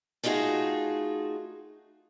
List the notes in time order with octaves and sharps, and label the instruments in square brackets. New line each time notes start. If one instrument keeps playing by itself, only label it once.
[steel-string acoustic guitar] A3 D#4 F4 F#4 G#4